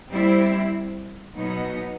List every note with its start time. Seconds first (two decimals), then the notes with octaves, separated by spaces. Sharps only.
0.11 G3 C4 E4
1.35 B2 F#3 B3 D#4